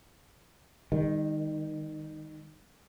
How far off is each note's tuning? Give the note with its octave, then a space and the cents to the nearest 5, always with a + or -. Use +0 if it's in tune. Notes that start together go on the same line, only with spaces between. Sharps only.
D#3 +0 G#3 -40